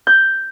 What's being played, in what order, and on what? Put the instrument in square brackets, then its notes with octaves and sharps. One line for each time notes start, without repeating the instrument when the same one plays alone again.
[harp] G6